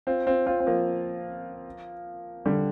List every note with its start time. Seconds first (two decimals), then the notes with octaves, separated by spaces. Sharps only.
0.07 C4 F4
0.26 C4 F4
0.46 C4 F4
0.60 C4
0.66 F3 A#3
2.45 D3 G3